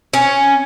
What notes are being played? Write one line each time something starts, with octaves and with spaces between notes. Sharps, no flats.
C#4